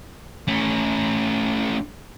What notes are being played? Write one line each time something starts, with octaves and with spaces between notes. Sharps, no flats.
A3 C#4